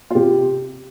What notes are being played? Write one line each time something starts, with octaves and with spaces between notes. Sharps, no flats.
F4
C3 G4